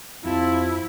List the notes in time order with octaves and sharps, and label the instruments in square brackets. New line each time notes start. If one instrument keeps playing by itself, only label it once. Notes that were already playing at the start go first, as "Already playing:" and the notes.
[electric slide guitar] F2 G4 A5 [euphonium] C4 [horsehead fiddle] E4 [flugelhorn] F4